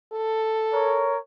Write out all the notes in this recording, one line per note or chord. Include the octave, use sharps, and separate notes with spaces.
A4
A#4 C#5